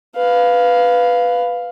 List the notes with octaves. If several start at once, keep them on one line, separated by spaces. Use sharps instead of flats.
B4 F5